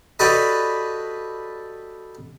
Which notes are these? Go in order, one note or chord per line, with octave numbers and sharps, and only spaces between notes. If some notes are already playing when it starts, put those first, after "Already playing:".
F#4 G4 A4 B4 D5 D#5